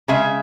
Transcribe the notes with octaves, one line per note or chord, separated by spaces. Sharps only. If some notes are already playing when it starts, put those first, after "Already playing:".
C#3 G#3 E5